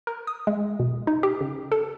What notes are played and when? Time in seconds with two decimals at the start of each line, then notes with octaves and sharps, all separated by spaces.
0.07 A#4
0.27 D#6
0.47 G#3
0.80 B2
1.07 D#4
1.23 G4
1.41 C#3
1.72 A4